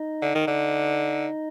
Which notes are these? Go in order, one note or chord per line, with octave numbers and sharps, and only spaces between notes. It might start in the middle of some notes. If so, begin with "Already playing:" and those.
Already playing: D#4 D#5
D3
D#3
D3